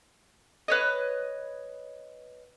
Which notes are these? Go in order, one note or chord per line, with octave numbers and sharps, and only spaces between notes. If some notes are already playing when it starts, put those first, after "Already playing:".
B4 C#5 D#5